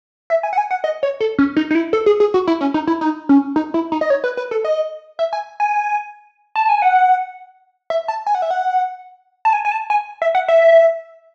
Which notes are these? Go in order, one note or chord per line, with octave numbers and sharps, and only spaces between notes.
E5
G#5
F#5
G#5
F#5
D#5
C#5
A4
C#4
D#4
D#4
E4
A4
G#4
G#4
F#4
E4
C#4
D#4
E4
D#4
C#4
D#4
E4
D#4
D#5
C#5
B4
B4
A4
D#5
E5
G#5
G#5
A5
G#5
F#5
E5
A5
G#5
F#5
E5
F#5
A5
G#5
G#5
A5
G#5
E5
F#5
E5